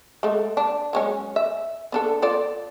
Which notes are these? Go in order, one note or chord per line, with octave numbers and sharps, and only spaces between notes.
G#3 A3
D4
F#3 G#3 C#4
E5
B3 D4 A4
F4 A4 D5